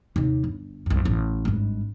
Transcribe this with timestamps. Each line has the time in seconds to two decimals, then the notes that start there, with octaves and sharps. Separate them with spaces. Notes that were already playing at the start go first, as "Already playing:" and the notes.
0.16 D#2 C3
0.44 G1
0.86 C2 F#2
1.05 A1
1.45 G#1 G2